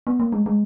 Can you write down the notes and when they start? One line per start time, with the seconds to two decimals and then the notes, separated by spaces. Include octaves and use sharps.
0.07 B3
0.20 A#3
0.32 G#3
0.46 G#3